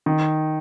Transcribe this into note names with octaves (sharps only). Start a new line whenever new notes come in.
D#3